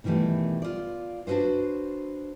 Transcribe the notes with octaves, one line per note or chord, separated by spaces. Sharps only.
B2 D#3 E3 G3 A3
F4 D5
D4 F#4 A4 B4 C5